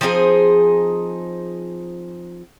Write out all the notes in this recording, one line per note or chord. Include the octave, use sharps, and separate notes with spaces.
F3 C4 D#4 G#4